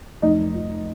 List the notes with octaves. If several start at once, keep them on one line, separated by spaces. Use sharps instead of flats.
F1 D#4 D#5
F3